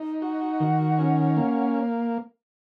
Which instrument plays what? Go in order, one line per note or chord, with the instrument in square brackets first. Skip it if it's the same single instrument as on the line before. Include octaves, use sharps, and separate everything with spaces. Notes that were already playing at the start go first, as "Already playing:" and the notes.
Already playing: [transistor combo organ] D#4
[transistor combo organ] F#4 [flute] F#5
[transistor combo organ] D#3
C#4
A#3